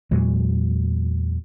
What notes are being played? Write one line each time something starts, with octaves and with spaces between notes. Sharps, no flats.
E2 A#2 F#3 G#3